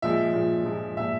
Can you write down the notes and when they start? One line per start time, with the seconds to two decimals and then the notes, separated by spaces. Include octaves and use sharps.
0.02 A#2 F3 G#3 E5
0.34 A#2 F3 G#3
0.65 A#2 F3 G#3
0.97 A#2 F3 G#3 E5